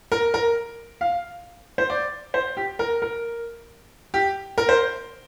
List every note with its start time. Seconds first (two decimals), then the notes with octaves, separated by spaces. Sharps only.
0.12 A#4
0.34 A#4
1.01 F5
1.78 C5
1.90 D5
2.34 C5
2.57 G4
2.79 A#4
3.02 A#4
4.14 G4
4.58 A#4
4.69 C5